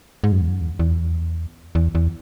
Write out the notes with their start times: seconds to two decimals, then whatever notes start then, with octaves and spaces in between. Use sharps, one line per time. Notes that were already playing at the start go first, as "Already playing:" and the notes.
0.24 G#2
0.32 F#2
0.41 E2
0.50 F#2
0.61 E2
0.79 E2
1.75 E2
1.95 E2